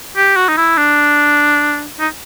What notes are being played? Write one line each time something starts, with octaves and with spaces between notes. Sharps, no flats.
G4
F#4
D#4
E4
D4
D#4